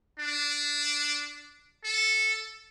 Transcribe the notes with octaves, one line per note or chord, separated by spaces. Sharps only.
D4
A4